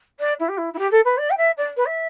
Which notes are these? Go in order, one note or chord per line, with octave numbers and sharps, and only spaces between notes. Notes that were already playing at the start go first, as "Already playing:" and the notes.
D5
E4
G4
E4
E4
G4
A4
B4
D5
G5
E5
D5
B4
E5